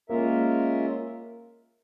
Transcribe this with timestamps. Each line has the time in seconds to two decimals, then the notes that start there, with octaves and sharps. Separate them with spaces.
0.09 G#3 A#3 C#4 F4 A#4 E5